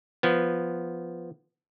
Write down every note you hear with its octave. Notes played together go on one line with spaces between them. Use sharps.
F3 B3